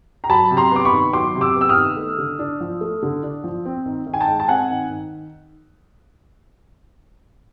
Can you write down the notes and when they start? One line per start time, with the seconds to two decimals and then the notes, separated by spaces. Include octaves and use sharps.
0.24 A#5
0.30 F#3 A5 B5
0.50 C3
0.57 A#5 C6
0.71 B3 D6
0.85 B5 C#6
0.92 D#3
1.13 F#3 C6 D6
1.35 C3
1.41 D6 E6
1.56 B3
1.61 E6
1.69 D#6 F6
1.76 D#3
1.97 A3
2.18 D3
2.39 D4
2.61 F3
2.81 A3
3.03 D3
3.23 D4
3.44 F3
3.65 C4
3.86 D#3
4.06 D#3
4.14 G#5
4.21 G5 A5
4.28 G#3
4.40 A5
4.48 C4 F#5 G#5
4.70 D#3
4.90 D#3